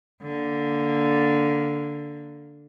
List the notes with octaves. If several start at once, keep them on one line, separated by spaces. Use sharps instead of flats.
D3 A#3